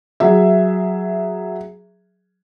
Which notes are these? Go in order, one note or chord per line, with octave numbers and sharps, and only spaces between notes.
F#3 G#4 E5